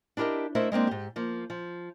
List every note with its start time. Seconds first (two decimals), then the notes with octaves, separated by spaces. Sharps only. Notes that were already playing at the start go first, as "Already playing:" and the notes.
0.17 D4 E4 G4 A#4 D#5
0.55 A3 E4 A#4 C5 D#5 E5
0.72 G#3 A#3 C4 D4
0.87 G#2 G4
1.16 F3 A#3
1.50 F3